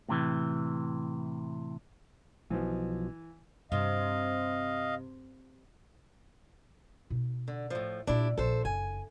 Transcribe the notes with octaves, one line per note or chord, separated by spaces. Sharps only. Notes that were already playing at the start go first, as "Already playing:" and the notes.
A2 C3 E3
B1 B2 E3 F3
G2 C3 D#5 F5
B2 D#4
D3
A2 F3
A#2 A#3 D4 E4 G4
A#1 A4 C5
F#1 G#5